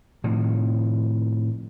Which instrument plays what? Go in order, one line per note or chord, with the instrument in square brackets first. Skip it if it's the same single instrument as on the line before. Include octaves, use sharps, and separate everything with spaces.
[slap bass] A2 C3 D#3 F3